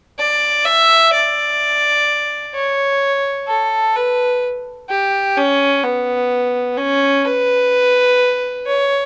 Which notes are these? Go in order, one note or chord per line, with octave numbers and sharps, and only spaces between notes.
D5
E5
D5
C#5
A4
B4
G4
C#4
B3
C#4
B4
C#5